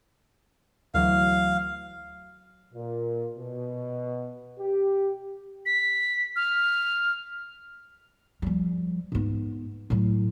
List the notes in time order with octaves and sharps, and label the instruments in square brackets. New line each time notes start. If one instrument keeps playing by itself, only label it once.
[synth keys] D2 E3 F#3 [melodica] F5
[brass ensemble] A#2
B2
G4
[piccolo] B6
F6
[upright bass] F3 G3
G#2 B3
A2 F#3